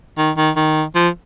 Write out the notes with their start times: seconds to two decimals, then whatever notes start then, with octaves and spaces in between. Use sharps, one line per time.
0.18 D#3
0.37 D#3
0.56 D#3
0.95 F3